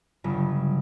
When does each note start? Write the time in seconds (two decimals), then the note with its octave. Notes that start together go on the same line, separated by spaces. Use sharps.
0.24 G1 C#3 F#3 G3